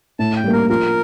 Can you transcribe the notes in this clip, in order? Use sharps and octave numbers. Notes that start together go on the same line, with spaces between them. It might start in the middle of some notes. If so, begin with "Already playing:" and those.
A2 A5
G5
G3 A#3
A#4
F3 A#4